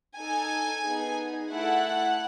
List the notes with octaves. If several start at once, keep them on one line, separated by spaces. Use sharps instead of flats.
D#4 A4 G#5
B3 D#4 G#4
A3 E4 A4 F#5